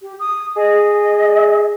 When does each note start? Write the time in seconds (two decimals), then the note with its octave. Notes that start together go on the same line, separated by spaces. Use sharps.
0.01 G4
0.19 D#6
0.56 G#4 D#5